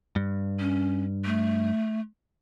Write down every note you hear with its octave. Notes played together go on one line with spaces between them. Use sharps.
G2
C#4
A3